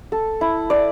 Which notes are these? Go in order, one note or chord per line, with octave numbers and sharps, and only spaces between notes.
A4
E4
D5